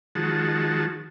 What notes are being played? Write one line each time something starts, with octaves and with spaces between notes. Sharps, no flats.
D#3 F3 G#3 F#4 A5